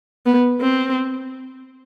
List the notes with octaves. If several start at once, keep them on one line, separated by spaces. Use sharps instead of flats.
B3
C4